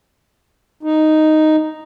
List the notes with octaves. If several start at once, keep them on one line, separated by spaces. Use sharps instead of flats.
D#4